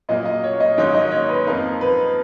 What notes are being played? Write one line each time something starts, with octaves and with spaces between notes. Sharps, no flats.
A#2 F#3 A#3 D#5
D#5
C#5
D#5
G#2 D#3 F#3 A#3 D#4 C#5
D#5
C#5
B4
F2 F3 A#3 D#4 A#4
B4